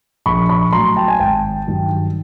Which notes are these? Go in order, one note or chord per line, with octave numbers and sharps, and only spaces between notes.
A#1 B5 C#6
B5 C#6
A2 F#3 A#5 C6
G5 A5
G#5
G#1 G5 A5
G2 D#3 F#3